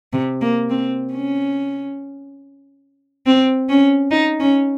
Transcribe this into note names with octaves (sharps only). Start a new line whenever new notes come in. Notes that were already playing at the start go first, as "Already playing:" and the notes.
C3
A#3
C4
C#4
C4
C#4
D#4
C#4